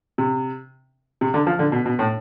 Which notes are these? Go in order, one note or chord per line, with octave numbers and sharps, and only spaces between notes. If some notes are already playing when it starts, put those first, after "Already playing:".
C3
C3
D3
F3
D3
B2
B2
A2